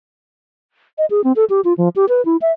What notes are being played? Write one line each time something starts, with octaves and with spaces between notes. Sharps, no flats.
D#5
G#4
C4
A4
G4
F4
F3
G4
B4
E4
E5